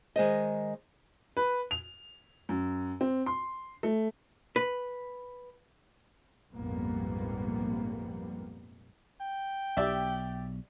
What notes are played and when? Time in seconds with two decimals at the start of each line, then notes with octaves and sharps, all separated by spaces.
0.16 D#3 G#3 C5 D#5
1.37 B4
1.71 F7
2.49 F#2
3.01 C4
3.26 C6
3.83 A3
4.56 B4
6.52 A#1 F2 G#2 G3 A#3 B3
9.21 G5
9.77 B1 G4 D5 E5